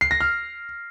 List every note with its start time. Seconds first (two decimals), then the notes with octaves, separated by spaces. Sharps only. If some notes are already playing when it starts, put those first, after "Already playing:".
0.01 C7
0.11 A#6
0.21 F6